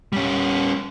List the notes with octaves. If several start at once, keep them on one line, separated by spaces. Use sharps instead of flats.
G3 C#4